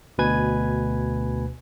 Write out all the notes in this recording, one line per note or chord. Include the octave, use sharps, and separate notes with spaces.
D2 B2 B4 G#5 G#6